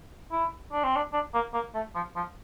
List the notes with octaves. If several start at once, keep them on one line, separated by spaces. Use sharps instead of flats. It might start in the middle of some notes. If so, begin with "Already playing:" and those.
E4
D4
C4
D4
D4
A#3
A#3
A3
F3
F3